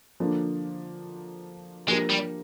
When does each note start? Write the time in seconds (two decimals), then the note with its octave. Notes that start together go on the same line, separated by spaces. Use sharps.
0.20 D3 F3 A#3 D4
1.88 F3 G#3 A#3 D4 G4 A#4
2.09 G3